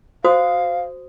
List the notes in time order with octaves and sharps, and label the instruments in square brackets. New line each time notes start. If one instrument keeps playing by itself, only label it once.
[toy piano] F#4 C5 D#6 [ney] F5